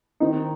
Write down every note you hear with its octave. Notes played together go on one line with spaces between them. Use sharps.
D#3 C4 D#4